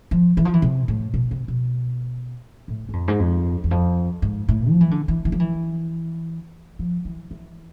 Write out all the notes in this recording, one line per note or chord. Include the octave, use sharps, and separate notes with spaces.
F3
E3
F3
E3
C3
A2
B2
C3
B2
A2
G#2
F2
G#2
F2
E2
F2
G#2
A2
F3
E3
D3
E3
E3
F3
E3
F3
E3
E3